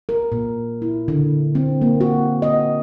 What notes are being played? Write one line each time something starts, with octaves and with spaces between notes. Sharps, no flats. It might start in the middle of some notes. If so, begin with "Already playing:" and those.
A#4
A#2
E4
D3
C4
A#3
F#4
D#5